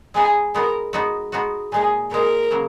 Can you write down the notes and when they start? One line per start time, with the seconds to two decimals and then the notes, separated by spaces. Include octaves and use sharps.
0.14 G#3 B3 D#4 G#4
0.54 G#3 B3 D#4 A#4
0.93 G#3 B3 D#4 F#4
1.32 G#3 B3 D#4 F#4
1.72 A#2 G#3 D#4 G#4
2.11 A#2 G#3 D#4 A#4
2.51 C#3 F#3 A#3